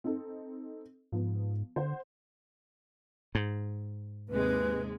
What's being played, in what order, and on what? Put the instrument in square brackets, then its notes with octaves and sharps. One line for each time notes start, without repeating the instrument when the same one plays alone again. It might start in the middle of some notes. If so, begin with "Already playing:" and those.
[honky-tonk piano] C4 D#4 A4
[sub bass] G#2 [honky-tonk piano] F3 B3
[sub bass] D3 [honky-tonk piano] C5 F#5
[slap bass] G#2
[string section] D#2 C3 G#3 [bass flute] B4